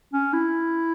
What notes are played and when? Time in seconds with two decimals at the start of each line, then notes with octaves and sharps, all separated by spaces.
0.13 C#4
0.33 E4